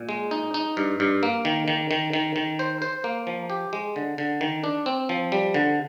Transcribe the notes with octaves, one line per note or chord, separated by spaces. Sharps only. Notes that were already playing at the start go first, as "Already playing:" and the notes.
Already playing: A#2
G#3
D#4
D#4
G2
G2
A#3
D#3
D#3
D#3
D#3
D#3
C5
C5
A#3
F3
G4
G#3
D3
D3
D#3
D4
C4
F3
G3
D3